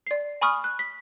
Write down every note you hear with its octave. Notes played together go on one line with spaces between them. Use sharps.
D5 C7
G#5 B5 C#6 D#6 F6
F#6
B6